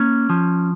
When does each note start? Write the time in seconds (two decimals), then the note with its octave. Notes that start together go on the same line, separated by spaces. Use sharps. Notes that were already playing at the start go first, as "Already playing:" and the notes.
Already playing: A#3 C#4
0.30 F3